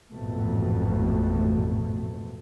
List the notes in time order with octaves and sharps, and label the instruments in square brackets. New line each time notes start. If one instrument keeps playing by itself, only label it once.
[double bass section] A1 F2 G#2 B2 A3